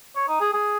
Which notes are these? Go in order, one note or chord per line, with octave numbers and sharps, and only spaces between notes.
C#5
D#4
G#4
G#4